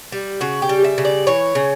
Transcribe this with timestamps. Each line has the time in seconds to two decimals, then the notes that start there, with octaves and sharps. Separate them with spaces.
0.12 G3
0.41 C#3 F#4
0.62 G4
0.69 G3
0.84 E5
0.98 C#3
1.05 D5
1.27 E3 C#5
1.55 C#3